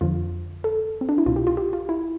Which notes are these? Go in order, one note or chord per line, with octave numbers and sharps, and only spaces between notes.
F2 D3 F3 F4
A4
C4
D4
E4
C2 B2 F4
G4
F4
G4
F4
E4